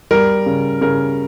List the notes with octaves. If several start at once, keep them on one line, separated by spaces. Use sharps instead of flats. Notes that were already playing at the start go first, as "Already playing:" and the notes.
G3 A#4
C#3
C#3 A#4